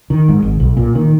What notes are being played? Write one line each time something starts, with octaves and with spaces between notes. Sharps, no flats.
D#3
G#2
G#1
B1
A#2
D#3